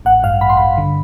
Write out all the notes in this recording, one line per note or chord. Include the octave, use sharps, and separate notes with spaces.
A1 F#5
G2 F5
A1 B5
C6
G2 B5
D3